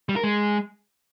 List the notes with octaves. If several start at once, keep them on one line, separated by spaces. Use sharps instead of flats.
G3
A#4
G#3